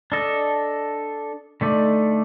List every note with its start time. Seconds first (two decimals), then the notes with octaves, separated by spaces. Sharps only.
0.12 D4 A4 D#5
1.61 D3 A3 D#4 A4 D5